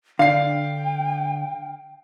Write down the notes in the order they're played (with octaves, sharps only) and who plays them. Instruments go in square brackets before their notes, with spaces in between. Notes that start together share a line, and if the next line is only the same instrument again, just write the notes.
[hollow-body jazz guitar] D3 [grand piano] F5 C7 [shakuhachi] G5